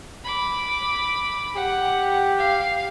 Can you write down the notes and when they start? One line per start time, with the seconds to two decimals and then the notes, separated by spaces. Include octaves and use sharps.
0.24 B5 D6
1.56 G4 F#5
2.39 F5